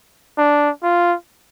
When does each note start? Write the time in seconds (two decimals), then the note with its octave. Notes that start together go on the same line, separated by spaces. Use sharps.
0.38 D4
0.83 F4